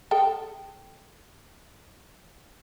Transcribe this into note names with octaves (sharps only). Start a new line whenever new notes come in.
G#4 A4 G5